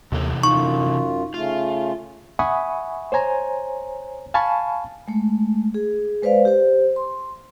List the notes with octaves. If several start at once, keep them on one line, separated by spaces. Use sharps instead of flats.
D#2 C3 E3 A4
F#2 D#4 F4 C#6
C#3 A3 F4
E5 F#5 G#5 B5 C#6 D#6
C5 C#5 G#5 A#5
F5 G#5 A5 B5 C#6
G#3 A3
G#4
G#3 B4 C5 D5 F5
G4 C5
C6